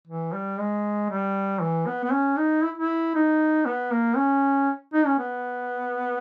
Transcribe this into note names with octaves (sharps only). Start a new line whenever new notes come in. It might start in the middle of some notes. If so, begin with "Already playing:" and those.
E3
G3
G#3
G3
E3
B3
B3
C#4
D#4
E4
E4
D#4
B3
A#3
C#4
D#4
C#4
B3